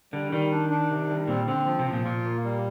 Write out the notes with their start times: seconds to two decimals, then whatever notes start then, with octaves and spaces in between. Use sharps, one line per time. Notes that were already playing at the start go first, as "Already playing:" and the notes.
0.12 D3 G3
0.32 D#3 G3
0.51 D4
0.70 D4
0.90 C3
1.09 G3
1.27 A#2 C4
1.47 D3 C4
1.66 F3
1.79 C3
1.86 F3
1.93 A#2
2.04 A#2 F4
2.25 A#3
2.44 G3